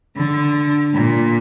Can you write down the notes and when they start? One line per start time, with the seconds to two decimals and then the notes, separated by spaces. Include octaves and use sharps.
0.17 D3
0.94 A#2